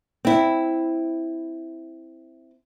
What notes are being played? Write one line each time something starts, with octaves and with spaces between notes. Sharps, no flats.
C4 E4